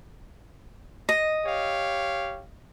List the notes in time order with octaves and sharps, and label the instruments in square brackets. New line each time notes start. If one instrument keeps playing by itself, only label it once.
[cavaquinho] D#5
[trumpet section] G4 C#5 F5